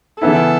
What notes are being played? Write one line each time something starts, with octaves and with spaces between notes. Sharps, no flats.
C#3 E3 B3 E4 A4